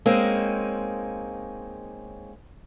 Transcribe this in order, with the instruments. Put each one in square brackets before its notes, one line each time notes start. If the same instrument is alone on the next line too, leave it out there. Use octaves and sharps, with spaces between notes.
[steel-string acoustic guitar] G#3 A#3 C4 C#4 D#4